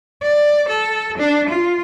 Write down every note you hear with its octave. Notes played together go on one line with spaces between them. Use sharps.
D5
A4
D4
F4